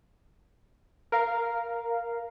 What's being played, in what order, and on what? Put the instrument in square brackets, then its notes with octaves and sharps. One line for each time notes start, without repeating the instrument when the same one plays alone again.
[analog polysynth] A#4 F5